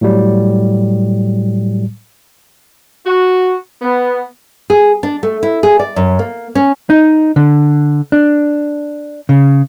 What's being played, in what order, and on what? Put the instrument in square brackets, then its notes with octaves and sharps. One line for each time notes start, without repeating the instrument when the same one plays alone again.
[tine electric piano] A2 F#3 G3
[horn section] F#4
B3
[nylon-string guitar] G#4
D4
A3
E4
G#4
D5
F#2
A#3
C#4
[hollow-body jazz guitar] D#4
D3
D4
C#3